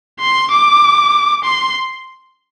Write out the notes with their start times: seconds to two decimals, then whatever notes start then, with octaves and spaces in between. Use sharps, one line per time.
0.20 C6
0.51 D6
1.44 C6